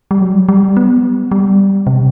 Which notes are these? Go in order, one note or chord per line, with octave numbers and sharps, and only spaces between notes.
G3
F#3
G3
B3
G3
C3